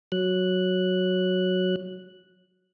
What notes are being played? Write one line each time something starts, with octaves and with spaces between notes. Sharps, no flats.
F#3 F#6